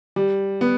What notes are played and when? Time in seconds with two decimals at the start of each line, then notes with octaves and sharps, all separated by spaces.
0.16 G3
0.61 B3